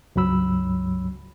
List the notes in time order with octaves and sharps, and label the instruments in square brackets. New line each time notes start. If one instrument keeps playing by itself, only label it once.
[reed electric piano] C#2 G2 F#3 B5 E6